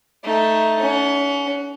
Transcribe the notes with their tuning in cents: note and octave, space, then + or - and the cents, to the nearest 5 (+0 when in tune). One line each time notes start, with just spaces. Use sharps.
A3 +0 D#4 +10
C#4 +35 F#5 +0